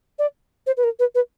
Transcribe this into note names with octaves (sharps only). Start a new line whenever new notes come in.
D5
C5
B4
A#4
B4
B4